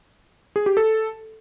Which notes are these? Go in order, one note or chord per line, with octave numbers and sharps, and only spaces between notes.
G#4
G4
A4